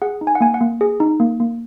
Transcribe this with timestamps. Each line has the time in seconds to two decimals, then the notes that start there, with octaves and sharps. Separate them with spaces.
0.02 G#4 F#5
0.21 D#4
0.27 G#5
0.35 F#5
0.41 A#3 G#5
0.54 F#5
0.61 A#3
0.81 G#4
1.00 D#4
1.20 A#3
1.40 A#3